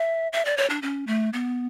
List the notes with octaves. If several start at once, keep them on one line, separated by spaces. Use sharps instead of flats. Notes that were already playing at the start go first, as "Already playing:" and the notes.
Already playing: E5
E5
D5
C#5
D4
C#4
A3
B3